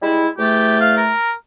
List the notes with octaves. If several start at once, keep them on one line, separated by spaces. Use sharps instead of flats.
G3 G#3 E4
E2 A3 G4
F5
A#4